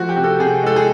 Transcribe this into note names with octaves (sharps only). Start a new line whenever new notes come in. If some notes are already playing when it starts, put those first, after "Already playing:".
Already playing: F3 A3 F#4
G4
C3
A4
C3 G#4
G#3 A4
G#4